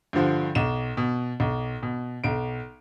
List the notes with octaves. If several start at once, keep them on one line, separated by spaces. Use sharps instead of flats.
G2 D3 F3
B1 E7
B2
B1
B2
B1 D7